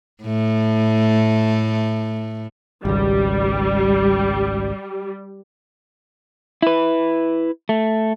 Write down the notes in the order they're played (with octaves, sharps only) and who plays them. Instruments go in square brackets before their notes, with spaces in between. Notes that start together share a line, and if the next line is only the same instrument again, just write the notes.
[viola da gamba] A2 A3
[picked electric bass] G#1 C#2 [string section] G3
[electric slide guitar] E4 B4
A3